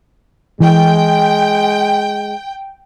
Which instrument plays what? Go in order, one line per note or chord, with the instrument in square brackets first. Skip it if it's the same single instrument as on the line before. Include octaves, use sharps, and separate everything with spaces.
[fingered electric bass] E3 [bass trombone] G#3 [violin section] G5